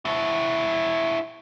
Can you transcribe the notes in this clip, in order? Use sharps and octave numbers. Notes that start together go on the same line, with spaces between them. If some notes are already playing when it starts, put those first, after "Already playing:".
E4 F#4